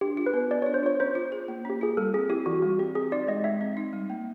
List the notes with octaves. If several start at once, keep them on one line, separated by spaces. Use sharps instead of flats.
D4 G4
F4
B4
B3
B3 D5
D4 C#5
C5
F4 C#5
C#4 C5
F4
G#4
A#3
C#4 G4
F4 G#4
G3 A4
C4 G#4
E4 G4
E3 F#4
G3 F#4
C4 G4
C4 G#4
D#4 D5
G#3 D#5
G#3 E5
C4
D#4
G3
A#3